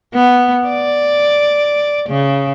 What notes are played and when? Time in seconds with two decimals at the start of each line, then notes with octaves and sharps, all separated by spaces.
0.14 B3
0.68 D5
2.09 C#3